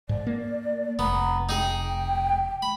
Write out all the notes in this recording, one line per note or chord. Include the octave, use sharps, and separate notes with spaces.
G#2 D5
A#3
F1 B3 A#5
D#4 G#4 G5
B5